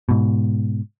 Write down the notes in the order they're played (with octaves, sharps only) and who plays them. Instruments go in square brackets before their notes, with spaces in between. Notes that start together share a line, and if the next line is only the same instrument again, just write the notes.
[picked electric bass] G#2 B2